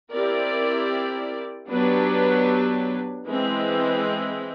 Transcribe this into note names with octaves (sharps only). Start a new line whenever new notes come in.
C4 E4 G4 A#4 D5
F#3 B3 D4 G4 B4
E3 G#3 C4